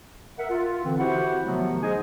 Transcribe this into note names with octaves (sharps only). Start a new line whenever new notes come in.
A#4 E5 F#5
F4
D3 E3 C4
E4 F#4 G4 C5 F#5
C3 D#3 F3 F#3 A3 B3
D#4 G#4 C5 D#5 G#5